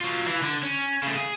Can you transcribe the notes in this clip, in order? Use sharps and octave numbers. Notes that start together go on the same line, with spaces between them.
F#3 F4
E3
D3
C#4
C#3 A3
G#4